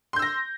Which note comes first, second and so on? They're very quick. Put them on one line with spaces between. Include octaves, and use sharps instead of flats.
C6 G6 E6 A#6